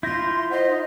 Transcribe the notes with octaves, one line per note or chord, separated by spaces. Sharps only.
E4 F4 C6 G6 A#6
C5 D#5 F#5
D#4